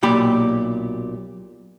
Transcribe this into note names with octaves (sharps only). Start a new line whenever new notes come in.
B1 A#2 G4 B5